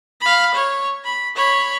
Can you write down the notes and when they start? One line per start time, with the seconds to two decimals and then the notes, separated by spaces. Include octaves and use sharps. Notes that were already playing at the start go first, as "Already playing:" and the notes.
0.21 F5 B5
0.54 C#5
1.04 B5
1.36 C#5 B5